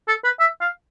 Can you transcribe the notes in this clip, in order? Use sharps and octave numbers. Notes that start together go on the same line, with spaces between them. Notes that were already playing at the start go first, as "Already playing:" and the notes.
A4
B4
E5
F5